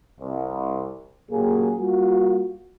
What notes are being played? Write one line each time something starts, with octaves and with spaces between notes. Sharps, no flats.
C2
A#2 C#3 F#3 A#3 G4 G#4
G3 A#3 F4 F#4